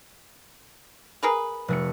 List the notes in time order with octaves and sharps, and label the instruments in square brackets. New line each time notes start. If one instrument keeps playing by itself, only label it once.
[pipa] G#4 A#4 B4
[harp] F1 A3 C#7